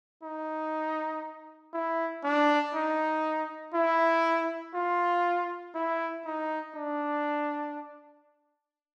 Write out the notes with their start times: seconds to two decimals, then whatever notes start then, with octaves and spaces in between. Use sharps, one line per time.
0.24 D#4
1.74 E4
2.24 D4
2.75 D#4
3.74 E4
4.75 F4
5.75 E4
6.25 D#4
6.75 D4